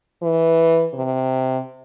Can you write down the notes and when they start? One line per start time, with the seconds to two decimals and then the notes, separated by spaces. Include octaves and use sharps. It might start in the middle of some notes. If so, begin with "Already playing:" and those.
0.22 E3
0.94 C3